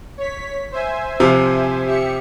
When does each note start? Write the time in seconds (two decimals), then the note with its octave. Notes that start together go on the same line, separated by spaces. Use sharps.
0.18 C#5 B6
0.72 C5 E5 G#5
1.20 C3 F3
1.85 G4 E5 C#7